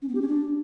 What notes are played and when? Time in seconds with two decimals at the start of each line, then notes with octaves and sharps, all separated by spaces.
0.02 C#4
0.08 B3
0.15 G4
0.21 C#4
0.28 D4